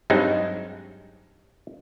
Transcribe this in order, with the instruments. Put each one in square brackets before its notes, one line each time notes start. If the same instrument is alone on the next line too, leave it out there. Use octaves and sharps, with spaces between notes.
[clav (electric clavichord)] G2 F#3 G#3 C4 D#4